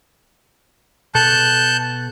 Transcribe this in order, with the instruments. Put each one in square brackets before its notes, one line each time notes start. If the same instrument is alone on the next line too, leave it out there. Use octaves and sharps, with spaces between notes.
[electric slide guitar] B2 A4 [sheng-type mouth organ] A5 F#6 G6